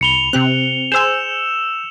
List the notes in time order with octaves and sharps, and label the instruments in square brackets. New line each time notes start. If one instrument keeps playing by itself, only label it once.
[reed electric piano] C2 B5 [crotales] C#7 F7 G7
[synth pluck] C3 G4 F#6 [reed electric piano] C4
[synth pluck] G#4 C5 G#5 [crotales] E6 E7 [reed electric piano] G6